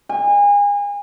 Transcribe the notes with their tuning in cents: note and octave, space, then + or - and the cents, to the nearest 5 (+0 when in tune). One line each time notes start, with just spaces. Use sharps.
G#5 -35